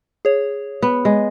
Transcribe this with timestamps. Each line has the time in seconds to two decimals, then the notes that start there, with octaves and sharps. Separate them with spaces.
0.25 G#4 C#5
0.82 B3
1.05 G#3